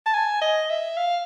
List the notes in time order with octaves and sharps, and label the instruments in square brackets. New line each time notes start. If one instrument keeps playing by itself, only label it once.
[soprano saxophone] A5
G#5
D#5
E5
F5